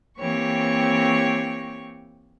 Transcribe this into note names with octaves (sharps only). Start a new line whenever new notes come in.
E3 A#3 C4 G4 C#5 C#6